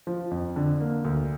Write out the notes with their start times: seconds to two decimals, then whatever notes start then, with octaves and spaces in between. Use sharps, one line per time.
0.07 F3
0.31 F2
0.56 D3
0.80 A#3
1.05 D2